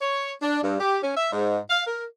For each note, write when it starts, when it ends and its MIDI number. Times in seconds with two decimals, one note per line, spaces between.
0.01 0.32 73
0.42 0.61 62
0.63 0.79 43
0.80 0.99 67
1.03 1.13 61
1.17 1.29 76
1.32 1.59 44
1.68 1.84 77
1.87 2.04 70